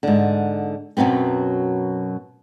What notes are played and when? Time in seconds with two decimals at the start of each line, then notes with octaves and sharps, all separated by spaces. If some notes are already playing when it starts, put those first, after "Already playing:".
0.03 G#2 D3
0.97 F#2 B2 F#3 B3 C4